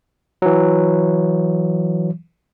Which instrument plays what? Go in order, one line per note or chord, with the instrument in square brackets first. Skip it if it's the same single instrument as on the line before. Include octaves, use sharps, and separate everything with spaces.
[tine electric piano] E3 F#3